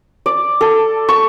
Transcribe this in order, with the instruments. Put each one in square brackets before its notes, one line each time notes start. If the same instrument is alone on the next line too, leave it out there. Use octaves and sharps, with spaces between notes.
[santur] D5
A4
C#6